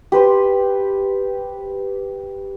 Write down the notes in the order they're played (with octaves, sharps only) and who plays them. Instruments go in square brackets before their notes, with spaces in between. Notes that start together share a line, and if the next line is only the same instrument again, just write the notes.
[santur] G4 B4 C5